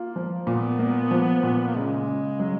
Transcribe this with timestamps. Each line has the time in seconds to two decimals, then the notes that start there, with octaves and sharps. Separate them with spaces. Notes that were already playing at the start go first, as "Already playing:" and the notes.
Already playing: A#3 F4
0.16 F3
0.47 A#2 B3
0.79 A#3
1.11 F3
1.43 A#2
1.68 A#3
1.75 C#3 G#3
2.07 C#3
2.39 F#3